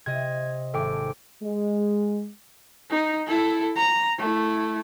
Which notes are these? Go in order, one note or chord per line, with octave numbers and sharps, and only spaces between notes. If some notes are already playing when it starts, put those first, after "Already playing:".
C3 D#5 G#6
G#1 A4 G5 D6
G#3
D#4
E4 A4
A#5
A3 E4